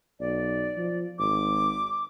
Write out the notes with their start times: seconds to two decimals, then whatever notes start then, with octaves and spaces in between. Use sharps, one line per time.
0.20 B1 D5
0.78 F3
1.19 G#1 D6